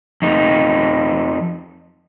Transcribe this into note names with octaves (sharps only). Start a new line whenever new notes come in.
F2 D#4